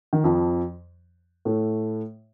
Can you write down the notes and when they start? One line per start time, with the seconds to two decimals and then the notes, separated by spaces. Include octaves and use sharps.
0.13 D#3
0.24 F2 F3
1.45 A2 A3